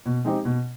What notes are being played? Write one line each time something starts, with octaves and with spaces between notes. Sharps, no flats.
B2
G#3 C4 D#4 G4
B2